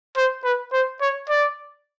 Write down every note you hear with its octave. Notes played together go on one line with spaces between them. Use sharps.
C5
B4
C5
C#5
D5